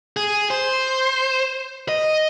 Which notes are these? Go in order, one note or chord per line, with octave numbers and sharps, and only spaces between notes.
G#4
C5
D#5